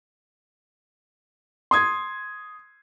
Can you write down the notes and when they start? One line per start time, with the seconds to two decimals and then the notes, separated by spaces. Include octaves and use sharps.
1.71 C6 D#6 G#6